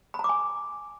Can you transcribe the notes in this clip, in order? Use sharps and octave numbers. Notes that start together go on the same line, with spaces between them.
B5
A#5
D6
G#5